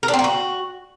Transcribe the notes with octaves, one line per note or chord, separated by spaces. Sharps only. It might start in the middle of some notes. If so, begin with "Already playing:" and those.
A#4
D4
C4
A#3
F#4